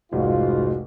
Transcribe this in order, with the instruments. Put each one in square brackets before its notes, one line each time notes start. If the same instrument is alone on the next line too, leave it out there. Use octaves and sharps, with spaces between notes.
[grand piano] F1 C2 [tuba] G#2 [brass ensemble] F4 F#4